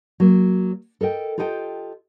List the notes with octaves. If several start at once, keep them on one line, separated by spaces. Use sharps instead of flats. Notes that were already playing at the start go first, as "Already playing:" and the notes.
F#3 A#3
A4 A#4 D#5 G5
F4 G4 A4 D#5 F#5 G5